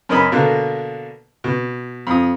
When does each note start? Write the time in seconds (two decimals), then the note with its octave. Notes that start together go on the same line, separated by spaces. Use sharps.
0.09 F#2 C#4 A#4 D#5 B5
0.32 B2 D3 A#3 F#6
1.44 B2
2.07 F2 D#6